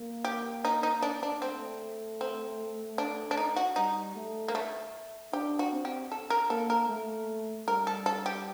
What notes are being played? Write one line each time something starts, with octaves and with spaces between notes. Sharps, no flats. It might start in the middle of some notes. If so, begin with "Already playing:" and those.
Already playing: A#3
G4
D#4
D#4
D4
D4
A3 C4
C4
D4
D4
D#4
F#4
G3 D#4
A3
A#3
A3
D4 G4
F#4
C4
G4
A4
A#4
A#3 A4
A#4
A3
G3 A#4
A4
A4
G4